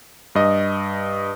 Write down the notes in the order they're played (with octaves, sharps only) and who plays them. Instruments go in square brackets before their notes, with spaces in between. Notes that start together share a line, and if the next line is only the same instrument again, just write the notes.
[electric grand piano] G2 D#5